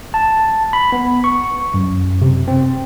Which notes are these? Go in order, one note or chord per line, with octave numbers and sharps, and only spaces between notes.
A5
B5
B3
C#6
F#2
C3
C4